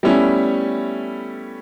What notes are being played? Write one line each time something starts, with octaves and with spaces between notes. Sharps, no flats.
G3 A3 B3 C#4 E4